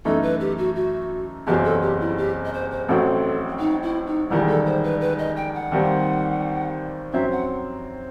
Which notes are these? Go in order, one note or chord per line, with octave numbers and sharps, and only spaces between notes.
F#2 E3 A3 D#4 A4
B4
G4
F#4
F#4
F#1 E2 C3 F#3 C4 G4
A4
G4
E4
G4
D#5
C5
C5
A1 A2 F#3 C4 F#4 A4
D#4
E4
D#4
E1 E2 D#3 G3 E4
A4
C5
B4
B4
D#5
G5
F#5
D#2 D#3 G3 C4
F#2 F#3 C4 E5
F#5